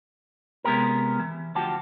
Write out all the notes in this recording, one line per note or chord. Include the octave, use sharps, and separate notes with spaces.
C3 G#3 B3 C#4 G4 A#4
E3
D2 F3 F#4 G4 A5